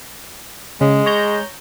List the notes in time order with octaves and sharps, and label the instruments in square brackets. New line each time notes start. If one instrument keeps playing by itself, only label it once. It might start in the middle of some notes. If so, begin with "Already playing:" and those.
[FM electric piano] C#3 [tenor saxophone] G#3
[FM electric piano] C#5 A#5 G6